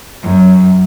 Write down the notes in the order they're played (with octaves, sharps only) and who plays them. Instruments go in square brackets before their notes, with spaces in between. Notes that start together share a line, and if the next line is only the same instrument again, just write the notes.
[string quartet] F#2